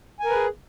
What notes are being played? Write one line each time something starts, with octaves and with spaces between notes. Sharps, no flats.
G#4 A#4 B4 G#5